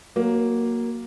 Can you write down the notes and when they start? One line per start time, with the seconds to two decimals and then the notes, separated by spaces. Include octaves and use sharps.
0.16 F#3 A#3